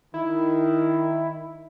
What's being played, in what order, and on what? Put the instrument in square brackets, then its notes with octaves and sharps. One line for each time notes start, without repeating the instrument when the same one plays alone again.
[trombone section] D#3 [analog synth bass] E4